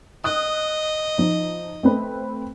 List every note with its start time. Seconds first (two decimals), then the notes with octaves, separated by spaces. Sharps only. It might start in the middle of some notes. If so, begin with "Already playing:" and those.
0.24 D#5 D#6 F#6
1.18 F3 D#4
1.83 A3 C4 B4